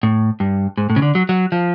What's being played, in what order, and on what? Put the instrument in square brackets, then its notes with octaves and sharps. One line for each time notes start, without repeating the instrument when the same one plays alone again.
[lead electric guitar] A2
G2
G#2
A2
C#3
D3
F#3
F#3
F3